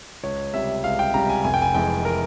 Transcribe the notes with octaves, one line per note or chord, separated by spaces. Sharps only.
C#2 C#5
C3 G3 E5
C#2 F5
G5
C3 G3 A#5
G#5
F1 G#5
G5
G#5
F2 E3 G#3 G5
A#4